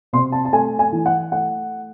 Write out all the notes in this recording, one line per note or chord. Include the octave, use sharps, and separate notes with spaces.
C3 C6
A5
A5
A3 G#5
G#5
E3
F#5
A3 F#5